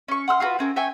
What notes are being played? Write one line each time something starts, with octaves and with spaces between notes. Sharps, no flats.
C#4 C#6
F#5 C6 E6 F6
F4 F#4 G#4 B4
C4 C#4 A#4
E5 G5 G#5 C#6